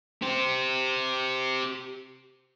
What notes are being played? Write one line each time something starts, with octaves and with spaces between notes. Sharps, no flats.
G4 C5